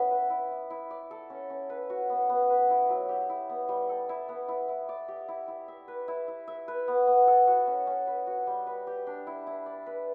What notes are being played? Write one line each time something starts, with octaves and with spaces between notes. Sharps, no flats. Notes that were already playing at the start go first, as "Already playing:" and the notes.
Already playing: B3 C#4 E4 E5
B4
E4
E4
E4
D5
A4
C#4
C#4
B4
F#4
B3
B3
B4
E4
F#3
G4
E4
B3
G3
A4
E4
B3
E4
E4
D5
G4
E4
E4
E5
B4
E4
E4
E5
B4
B3
B3
A4
F#4
C#4
C#4
B4
F#4
G3
B4
G4
D4
E4
E4
D5
B4